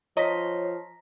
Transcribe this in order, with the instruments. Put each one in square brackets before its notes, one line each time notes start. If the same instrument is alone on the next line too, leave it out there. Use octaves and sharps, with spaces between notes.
[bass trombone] F3 [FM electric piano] C#5 [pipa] D#5 [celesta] A#5 A#6 B6